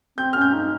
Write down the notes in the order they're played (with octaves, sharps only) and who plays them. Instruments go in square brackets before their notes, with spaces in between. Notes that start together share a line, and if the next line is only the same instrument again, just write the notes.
[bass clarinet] C4 [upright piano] G6
[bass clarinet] C#4 [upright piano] F6
[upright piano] G6
[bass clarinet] D#4